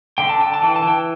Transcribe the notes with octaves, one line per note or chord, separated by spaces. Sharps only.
D3 G5
A5
D3 G5
A5
E3 G5
A5
E3
G5